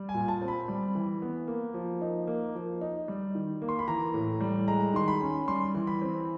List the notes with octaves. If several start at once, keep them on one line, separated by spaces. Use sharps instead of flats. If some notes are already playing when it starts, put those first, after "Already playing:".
Already playing: G3
G#5
A#2
A5
C4
B5
G3
E3
B3
A#3
F3
D#4
A#3
F3
D#4
G3
D#3
A#3
C6
B5
E3 A#5
A2
G3
G#3 A#5
D#3 C6
B5
C#4
G3 C6
E3
B5
C4